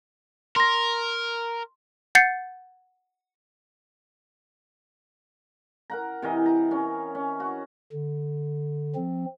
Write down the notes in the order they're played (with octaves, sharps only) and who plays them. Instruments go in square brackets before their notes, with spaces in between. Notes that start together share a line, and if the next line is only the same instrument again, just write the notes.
[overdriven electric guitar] A#4 [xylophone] C6 A#6
[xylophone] F#5 G6 A6 C7 C#7
[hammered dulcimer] A#4 F#5 A#5
C3 E3 A#4 D#5
A#5
C#4
C#4
F#4
[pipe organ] D3
F3 C4